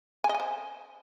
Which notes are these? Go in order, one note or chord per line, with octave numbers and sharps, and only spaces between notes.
G#5
D#5
G#5
C5